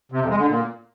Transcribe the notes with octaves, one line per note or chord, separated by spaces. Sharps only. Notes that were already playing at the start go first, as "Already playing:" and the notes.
C3
F2
G#3
D3
A#2